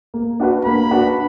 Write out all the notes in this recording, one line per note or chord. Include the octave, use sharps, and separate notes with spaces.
A#3
D4 F#4 B4
A#3 B5
D4 F#4 B4